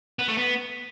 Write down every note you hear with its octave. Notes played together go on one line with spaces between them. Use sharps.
B3
A3
B3